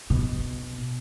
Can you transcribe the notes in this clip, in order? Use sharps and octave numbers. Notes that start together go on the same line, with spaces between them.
B2